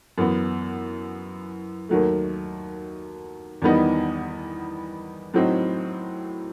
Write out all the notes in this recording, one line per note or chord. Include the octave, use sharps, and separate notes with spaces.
F#2 E3 B3
D#2 D#3 F#3 A3
E2 D#3 G3 B3 D#4
A2 F#3 C4 D#4